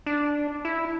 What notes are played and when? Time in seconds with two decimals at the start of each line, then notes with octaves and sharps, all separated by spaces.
0.06 D4
0.65 E4